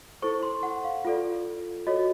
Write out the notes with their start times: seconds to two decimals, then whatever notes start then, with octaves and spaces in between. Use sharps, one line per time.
0.22 E4 A4 C5 C#6
0.43 C6
0.63 F#5
0.84 F5
1.05 F4 A4 D5
1.87 F#4 A4 C#5 D#5